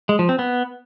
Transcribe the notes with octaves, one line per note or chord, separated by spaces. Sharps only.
G#3
F3
C4
B3